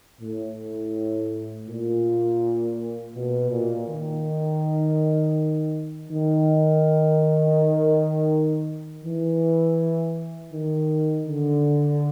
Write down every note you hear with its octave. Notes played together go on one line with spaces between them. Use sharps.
A2
A#2
B2
A#2
D#3
D#3
E3
D#3
D3